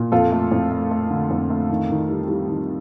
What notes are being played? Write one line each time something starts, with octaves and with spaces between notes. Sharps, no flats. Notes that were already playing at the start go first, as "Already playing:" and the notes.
Already playing: A#2
F2 F4 A4
A3
F2
A3
A3
D3
F2
A3
D#3
D#3
G3
G3
D#3